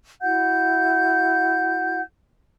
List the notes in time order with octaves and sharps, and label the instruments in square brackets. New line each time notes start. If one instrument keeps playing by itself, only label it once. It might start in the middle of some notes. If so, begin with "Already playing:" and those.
[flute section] E4 F#4 F#5 G6